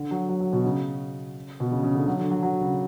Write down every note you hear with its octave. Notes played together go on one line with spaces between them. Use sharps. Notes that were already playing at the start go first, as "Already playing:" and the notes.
Already playing: D3
F#3
F#3
F#3
B2
C#3
B2
C#3
C#3
D3
F#3
D3
F#3
F#3
C#3